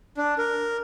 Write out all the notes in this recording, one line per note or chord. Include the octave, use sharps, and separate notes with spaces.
D4
A#4